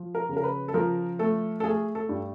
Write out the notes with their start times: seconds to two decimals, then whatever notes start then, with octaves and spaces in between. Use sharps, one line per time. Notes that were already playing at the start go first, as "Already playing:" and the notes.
Already playing: F3
0.15 A#4
0.29 C#3
0.37 A#4
0.44 B4
0.68 A4
0.74 F3 A#4
1.19 A3 A4
1.60 A4
1.64 A3 G#4
1.95 A4
2.09 G2